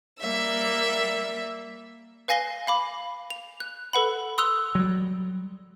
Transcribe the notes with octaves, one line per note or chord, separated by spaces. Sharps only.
G3 A#3 E5 E6
B4 F5 G#5 A#6 C7 G7
F5 B5 D6
F7
F#6
A4 B4 F#5 B5
C6 D#6 E6 F#6 F7 G7
F#3 G3